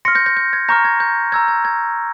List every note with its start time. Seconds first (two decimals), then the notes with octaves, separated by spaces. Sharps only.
0.05 C6 F6 A#6 C#7
0.15 G6 A#6
0.26 G6 A#6
0.37 G6
0.53 G#6
0.68 A#5 C#6 F6 G6 A#6
0.85 G#6
1.00 G6
1.32 A#5 E6 G6 G#6
1.48 G#6
1.65 G#6